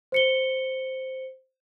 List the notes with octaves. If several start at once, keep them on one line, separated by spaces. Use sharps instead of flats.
C5 C#7 G7